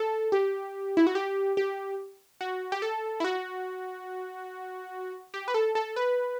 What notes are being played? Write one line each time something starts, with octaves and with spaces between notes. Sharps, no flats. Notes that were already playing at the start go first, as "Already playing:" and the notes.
Already playing: A4
G4
E4
F#4
G4
G4
F#4
G4
A4
E4
F#4
G4
B4
A4
A4
B4